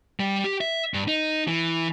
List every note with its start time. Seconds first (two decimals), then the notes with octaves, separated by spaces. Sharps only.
0.20 G3
0.44 G4
0.61 E5
0.94 G2
1.08 D#4
1.48 E3